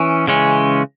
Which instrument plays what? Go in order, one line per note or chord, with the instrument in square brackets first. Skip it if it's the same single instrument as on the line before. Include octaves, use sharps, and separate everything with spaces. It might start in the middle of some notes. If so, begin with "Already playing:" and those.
Already playing: [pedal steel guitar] E3 C#4
C#3 E3 G#3 C#4